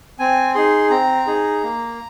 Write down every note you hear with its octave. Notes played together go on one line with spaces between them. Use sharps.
C4 G#5
D#4 G#4 C6
C4 A#5
D#4 G#4
A#3